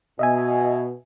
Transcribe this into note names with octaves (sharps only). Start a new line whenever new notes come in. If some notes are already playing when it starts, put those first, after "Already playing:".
B2 D#5 E5 G#5